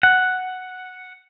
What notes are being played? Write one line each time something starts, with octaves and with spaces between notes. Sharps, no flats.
F#5